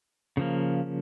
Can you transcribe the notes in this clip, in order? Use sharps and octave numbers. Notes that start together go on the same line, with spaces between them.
C#3 F3 A#3